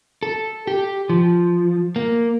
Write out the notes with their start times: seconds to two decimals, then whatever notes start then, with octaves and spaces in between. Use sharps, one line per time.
0.23 A4
0.67 G4
1.10 F3
1.96 A#3